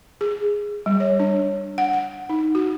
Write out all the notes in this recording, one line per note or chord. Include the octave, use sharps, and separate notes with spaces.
G#4
G3
C#5
D4
F#5
F#5
D#4
F#4